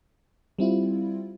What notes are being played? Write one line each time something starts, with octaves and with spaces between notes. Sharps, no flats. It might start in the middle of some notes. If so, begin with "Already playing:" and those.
G3 C4 E4 F4